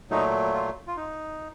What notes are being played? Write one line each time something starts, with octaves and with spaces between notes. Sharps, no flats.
A#2 F#3 A3 D#4
F4
F4
D#4